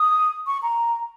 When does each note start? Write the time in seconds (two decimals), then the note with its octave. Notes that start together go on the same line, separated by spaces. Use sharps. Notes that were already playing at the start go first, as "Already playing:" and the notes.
Already playing: D#6
0.47 C#6
0.63 A#5